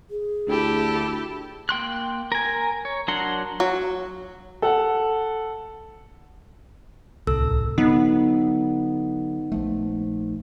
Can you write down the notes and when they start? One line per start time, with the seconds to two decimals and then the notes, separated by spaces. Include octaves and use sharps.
0.10 G#4
0.47 D2 E4 G4 A4
1.69 A#3 G5 C6 F#6
2.32 A#4 G#5
2.85 C#5
3.08 F#3 D4 A#4 F#5 C6
3.60 F#3
4.62 A4 F#5
7.27 D1 C2 A4 E6
7.78 D3 F#3 B3 D#4
9.52 A#1 F3 A3